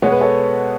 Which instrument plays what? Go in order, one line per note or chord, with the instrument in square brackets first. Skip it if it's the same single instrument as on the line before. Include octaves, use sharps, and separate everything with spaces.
[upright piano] B2 G#3 B3 [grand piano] C#5
[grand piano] B4
A4 C#5